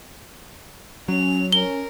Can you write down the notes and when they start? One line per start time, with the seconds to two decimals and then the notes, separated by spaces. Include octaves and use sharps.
1.08 F#3 C#4 F7
1.52 C#4 A#4 G7